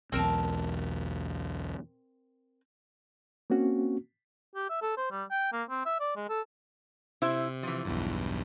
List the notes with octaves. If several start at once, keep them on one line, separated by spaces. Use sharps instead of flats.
B1 E2 C4 A#4 A5
A#3 C4 C#4 F#4
G4
E5
A4
C5
G3
G5
A#3
C4
E5
D5
G#3
A4
C3 E4 C5 E5
E3 F3
B1 E2 G2